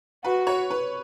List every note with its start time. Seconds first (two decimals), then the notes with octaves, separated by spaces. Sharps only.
0.24 F#4 B4
0.47 C#5
0.70 B4